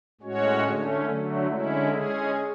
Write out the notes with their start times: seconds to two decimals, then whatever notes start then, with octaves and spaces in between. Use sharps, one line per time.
0.21 A2 G#3 C#4 F#4 C#5
0.64 D3 A3 C#4
1.06 D3 F#3 A3
1.47 D3 G#3 C#4 E4
1.89 G#3 C#4 G#4